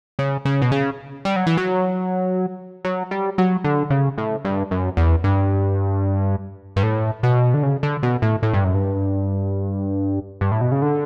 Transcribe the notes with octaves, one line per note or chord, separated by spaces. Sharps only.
C#3
C#3
B2
C#3
G3
F#3
E3
F#3
F#3
G3
F#3
D3
C#3
A2
G2
F#2
E2
G2
G2
A2
B2
D3
C#3
D3
B2
A2
A2
G2
F#2
G2
G2
A2
B2
C#3
D3